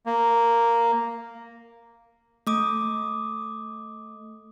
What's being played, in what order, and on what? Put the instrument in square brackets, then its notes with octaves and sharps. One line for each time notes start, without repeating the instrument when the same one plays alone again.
[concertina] A#3
[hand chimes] A3 D6 D#6